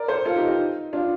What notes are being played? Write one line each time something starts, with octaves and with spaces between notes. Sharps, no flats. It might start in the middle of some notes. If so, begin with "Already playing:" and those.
Already playing: A#4 D5
A4 C5
F4 A4
D#4 G4
D#4
D4 F4